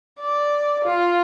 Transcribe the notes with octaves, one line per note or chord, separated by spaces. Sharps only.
D5
F4